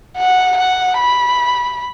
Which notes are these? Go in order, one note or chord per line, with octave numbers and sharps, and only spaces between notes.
F#5
F#5
B5